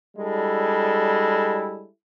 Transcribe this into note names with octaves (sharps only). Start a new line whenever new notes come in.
G3 G#3 D4 E4 A4